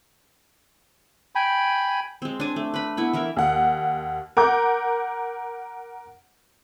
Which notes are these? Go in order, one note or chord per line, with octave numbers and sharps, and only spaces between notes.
G5 G#5 B5
G#3 C4
D4 G#5
A3
B4 B5
B3 E4 B5
E3 E4 A#4 E5
D#2 F#5
A#4 F#5 D6 G6